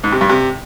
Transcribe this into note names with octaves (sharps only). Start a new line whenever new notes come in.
G#2
C3
G2
C3